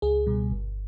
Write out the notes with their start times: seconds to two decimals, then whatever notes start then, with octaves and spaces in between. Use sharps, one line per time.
0.02 C#2 G#4
0.27 B2 G3
0.52 G1